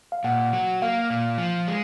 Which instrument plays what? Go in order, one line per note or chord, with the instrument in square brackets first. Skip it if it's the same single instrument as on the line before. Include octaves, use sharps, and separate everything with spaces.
[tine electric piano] F5
[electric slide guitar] A#2 [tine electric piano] F#5
[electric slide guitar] F#3
[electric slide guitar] A#3 [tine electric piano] F5
[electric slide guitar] A#2
F3
G#3